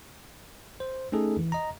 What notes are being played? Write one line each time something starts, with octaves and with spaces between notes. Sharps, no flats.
C5
A3 C#4 D#4 G#4 A4
E3
D#5 A#5